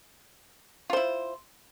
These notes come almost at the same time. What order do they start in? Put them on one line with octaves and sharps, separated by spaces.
F4 C5 E4